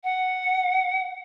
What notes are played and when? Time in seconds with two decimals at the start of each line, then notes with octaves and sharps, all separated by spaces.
0.04 F#5